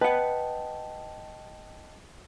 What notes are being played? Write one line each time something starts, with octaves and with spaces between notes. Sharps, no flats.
B4 D#5 F#5 G5 A5